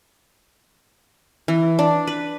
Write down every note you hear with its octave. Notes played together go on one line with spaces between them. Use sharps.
E3
D4
B4